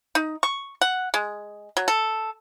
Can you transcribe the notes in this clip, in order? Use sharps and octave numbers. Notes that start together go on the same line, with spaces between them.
D#4
C#6
F#5
G#3
F#3
A4